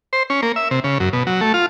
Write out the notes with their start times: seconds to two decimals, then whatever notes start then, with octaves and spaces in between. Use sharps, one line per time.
0.13 C5
0.30 C#4
0.42 A#3
0.56 E5
0.71 C3
0.84 C#3
1.00 F#2
1.13 B2
1.27 F#3
1.41 A3
1.54 F4